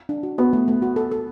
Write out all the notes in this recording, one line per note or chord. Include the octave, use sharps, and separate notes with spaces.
D4
F#4
B3 F#4
A3
A3
F#4
A4
A4